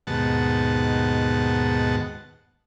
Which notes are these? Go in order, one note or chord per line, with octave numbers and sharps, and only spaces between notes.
D#2 G#2 B2 F#5 A5